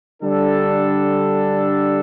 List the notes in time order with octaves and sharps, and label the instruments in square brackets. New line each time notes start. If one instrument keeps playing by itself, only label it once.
[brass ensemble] D3 G3 D4 A4